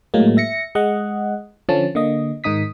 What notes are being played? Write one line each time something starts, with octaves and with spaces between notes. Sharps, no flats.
A2 F#3 G#3 A#3
E5 A#6 C#7
G#3 D#5 F#5
D3 F3 C#4 A5
D3 A#3 D#5
G#2 D#3 D#4 D#6 B6